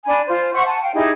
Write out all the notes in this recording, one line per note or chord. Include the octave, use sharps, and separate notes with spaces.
D4 G#5 B5
F4 C5
C5 E5 F#5 C#6
F#5 G#5 A5
F5 G5
D#4 E4 G4 G#4